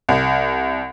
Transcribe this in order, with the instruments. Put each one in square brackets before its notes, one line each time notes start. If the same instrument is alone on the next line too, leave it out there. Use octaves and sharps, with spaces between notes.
[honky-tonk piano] C2